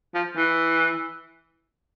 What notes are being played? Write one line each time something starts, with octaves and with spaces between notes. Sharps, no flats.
F3
E3